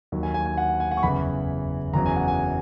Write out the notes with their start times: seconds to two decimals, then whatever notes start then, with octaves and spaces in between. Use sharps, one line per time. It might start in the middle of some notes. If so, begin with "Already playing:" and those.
0.12 D#2 D#3 F#3
0.23 G#5
0.34 G#5
0.46 G#5
0.57 F#5
0.80 G#5
0.91 F#5
0.97 C#6
1.02 F#1 E2 C#3 E3 B5
1.93 F#1 E2 C#3 F#3 A#5
2.06 G#5
2.16 F#5
2.28 G#5